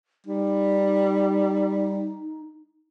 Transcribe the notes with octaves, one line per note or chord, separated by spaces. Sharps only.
G3 D#4